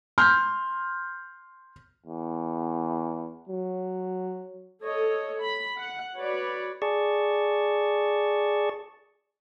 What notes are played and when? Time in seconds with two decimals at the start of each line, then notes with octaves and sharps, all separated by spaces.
0.18 C6 F6 G6
2.06 E2
3.49 F#3
4.83 A4 C#5 D#5
5.41 B5
5.77 F#5
6.16 F#4 B4 C#5 D5
6.82 G#4 D5 A5 C#6